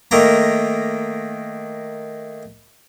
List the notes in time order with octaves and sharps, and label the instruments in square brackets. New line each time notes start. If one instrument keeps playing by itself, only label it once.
[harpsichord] D#3 A3 A#3 A#5